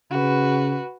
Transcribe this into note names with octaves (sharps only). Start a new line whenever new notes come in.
C#3 F#4 B4